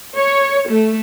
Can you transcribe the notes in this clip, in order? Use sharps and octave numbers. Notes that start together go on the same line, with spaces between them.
C#5
A3